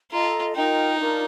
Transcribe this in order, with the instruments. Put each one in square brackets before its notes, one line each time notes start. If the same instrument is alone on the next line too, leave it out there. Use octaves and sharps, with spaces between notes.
[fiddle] F4 [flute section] A4 D#5 A#5
[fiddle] D#4 [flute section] F4 A#4 D#5 G5
[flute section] D4 F4 A#4